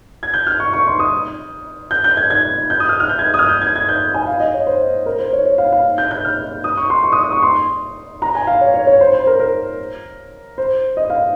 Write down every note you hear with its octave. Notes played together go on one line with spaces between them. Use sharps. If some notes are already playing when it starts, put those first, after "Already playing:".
G#6
G6
F6
C#6
C#6
C6
D#6
G6
G6
G#6
G#6
G6
D#6
F6
F6
G6
G#6
D#6
F6
G6
G#6
G#6
G6
G#5
F5
D#5
C#5
C5
A#4
C5
C#5
C#5
F5
F5
G6
G6
F6
D#6
C#6
C6
C#6
D#6
D#6
C#6
C6
A#5
G#5
F5
C#5
C#5
C#5
C5
C5
A#4
A#4
C5
D#5
F5